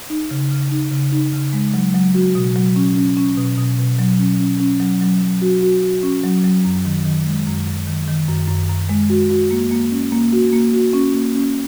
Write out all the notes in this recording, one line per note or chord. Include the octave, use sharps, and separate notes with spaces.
D#4
C#3
C#3
D#4
C#3
D#4
C#3
G#3
F#3
F#3
F#4
B2
F#3
C#4
C#4
C#4
B2
B2
B2
F#3
C#4
C#4
C#4
F#3
F#3
F#3
F#4
F#4
F#4
C#4
F#3
F#3
F#2
D#3
D#3
G#3
F#2
F#2
D#3
D#3
F#2
F#2
F#2
G#3
F#4
F#4
A#3
A#3
C#4
A#3
F#4
A#3
F#4
C#4
A#3
C#4